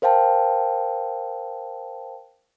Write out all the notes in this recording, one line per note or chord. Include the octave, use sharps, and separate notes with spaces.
A#4 C5 F5 G5 A5